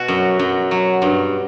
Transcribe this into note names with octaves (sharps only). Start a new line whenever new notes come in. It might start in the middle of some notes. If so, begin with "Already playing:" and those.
Already playing: B2 F#4
F#2
F#2
F#3
G2